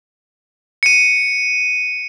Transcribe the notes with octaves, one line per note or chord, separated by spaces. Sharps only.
C#7 D#7